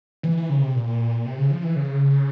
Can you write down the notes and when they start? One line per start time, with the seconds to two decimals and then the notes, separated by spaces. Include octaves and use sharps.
0.23 E3
0.37 E3
0.49 C#3
0.62 C3
0.75 A#2
1.25 C3
1.37 C#3
1.51 F3
1.63 E3
1.76 C#3